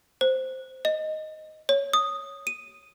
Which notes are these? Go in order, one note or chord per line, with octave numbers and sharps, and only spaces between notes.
C5
D#5
C#5
D#6
D#7